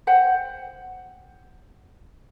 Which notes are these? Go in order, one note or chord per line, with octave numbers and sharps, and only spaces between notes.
C5 F#5 G5